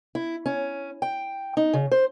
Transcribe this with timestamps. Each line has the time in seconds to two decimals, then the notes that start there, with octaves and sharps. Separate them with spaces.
0.15 E4
0.46 C#4
1.02 G5
1.57 D#4
1.73 C#3
1.91 C5